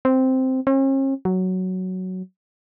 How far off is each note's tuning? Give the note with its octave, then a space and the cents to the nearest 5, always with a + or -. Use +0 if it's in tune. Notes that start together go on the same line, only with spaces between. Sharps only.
C4 -5
C#4 -45
F#3 +5